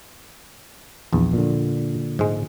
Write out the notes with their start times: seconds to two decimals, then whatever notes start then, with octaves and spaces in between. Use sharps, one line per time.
1.13 A#1 E2
1.33 A#2 D3
2.19 G#2 G#3